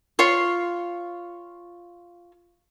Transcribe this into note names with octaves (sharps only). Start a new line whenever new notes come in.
F4 C#5 C6